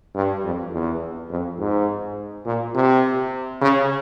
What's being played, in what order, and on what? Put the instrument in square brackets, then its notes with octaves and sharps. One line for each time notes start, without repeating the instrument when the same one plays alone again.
[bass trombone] G2
F2
E2
F2
G#2
A#2
C3
C#3